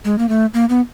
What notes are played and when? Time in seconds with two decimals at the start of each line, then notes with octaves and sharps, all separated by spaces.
0.05 G#3
0.18 A#3
0.29 A3
0.54 A#3
0.69 B3